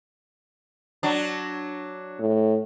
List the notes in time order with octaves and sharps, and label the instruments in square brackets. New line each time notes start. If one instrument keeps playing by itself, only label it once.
[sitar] F#3 D4
[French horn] A2